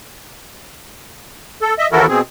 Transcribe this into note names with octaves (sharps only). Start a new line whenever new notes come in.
A4
D#5 E5
D#2 E3 E4 F#4 A4 A#4
B2 C4 G#4